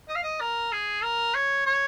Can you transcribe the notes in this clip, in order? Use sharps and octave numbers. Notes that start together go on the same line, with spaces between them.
D#5
F5
D#5
A#4
G#4
A#4
C#5
C#5